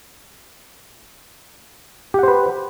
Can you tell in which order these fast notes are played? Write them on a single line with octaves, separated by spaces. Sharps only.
G4 F#5 C5 B4